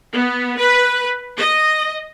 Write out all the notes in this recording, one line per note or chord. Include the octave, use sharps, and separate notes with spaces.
B3
B4
D#5